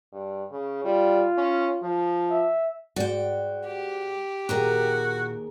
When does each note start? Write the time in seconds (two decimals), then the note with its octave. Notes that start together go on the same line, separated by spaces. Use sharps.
0.12 G2
0.52 C#3
0.85 G3 F4
1.38 C#4
1.82 F3
2.30 E5
2.96 G#2 F#4 D5 G5
3.67 G4
4.49 D#2 A#2 F#4 G#4 A#4 G5